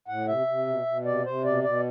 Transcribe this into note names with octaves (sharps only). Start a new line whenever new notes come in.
A2 F#5
C3 E5
C3
B2
B2
C3 D5
C3 C5
B2 D5
B2 D5